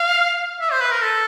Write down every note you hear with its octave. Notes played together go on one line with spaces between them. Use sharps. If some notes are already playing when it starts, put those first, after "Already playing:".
Already playing: F5
E5
C5
B4
A#4
A4